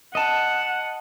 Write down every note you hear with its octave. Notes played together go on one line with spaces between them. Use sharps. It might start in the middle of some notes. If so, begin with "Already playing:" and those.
D#5 F#5 A5